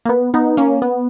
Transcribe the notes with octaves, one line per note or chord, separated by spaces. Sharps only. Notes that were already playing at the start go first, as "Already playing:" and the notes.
A#3
B3
B3 D#4
A#3 C#4
B3